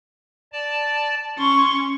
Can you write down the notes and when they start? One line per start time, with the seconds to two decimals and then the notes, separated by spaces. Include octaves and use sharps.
0.52 D5 A5
1.38 C#4 C6 C#6